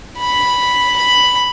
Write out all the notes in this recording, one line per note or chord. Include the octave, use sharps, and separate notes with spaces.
B5
B5